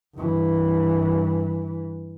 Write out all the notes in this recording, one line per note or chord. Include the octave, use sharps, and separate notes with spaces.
G2 E3